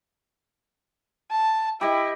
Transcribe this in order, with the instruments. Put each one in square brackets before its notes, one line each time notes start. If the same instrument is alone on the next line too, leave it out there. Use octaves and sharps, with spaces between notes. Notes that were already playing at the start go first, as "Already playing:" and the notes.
[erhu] A5
[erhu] E4 [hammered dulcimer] G4 D#5